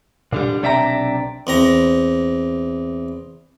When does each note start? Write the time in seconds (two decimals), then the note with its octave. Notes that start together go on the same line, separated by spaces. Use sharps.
0.33 A#2 D3 G3
0.62 B1 C3 D4 E5 G5 A#5
1.47 E2 C4 A#5